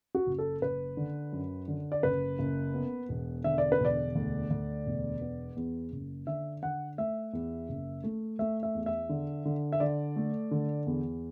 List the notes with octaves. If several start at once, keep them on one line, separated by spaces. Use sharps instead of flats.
F#4
F#1
A4
F#1 B4
D3
F#2
D3
D5
F#1 B4
F#1
B3
E1
D3 E5
D5
B4
E1 D5
D2
D2
E1
B3
E2
F#1
D3 E5
D3 F#5
A3 E5
E2
F#1
A3
A3 E5
E5
E2
E5
D3
D3
E5
D3 D5
A3
D3
E2